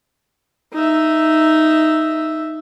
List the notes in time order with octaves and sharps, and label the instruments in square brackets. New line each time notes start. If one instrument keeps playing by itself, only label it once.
[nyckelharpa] D#4 E5